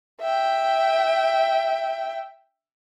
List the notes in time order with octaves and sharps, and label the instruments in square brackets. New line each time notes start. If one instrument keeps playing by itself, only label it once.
[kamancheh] E5 G5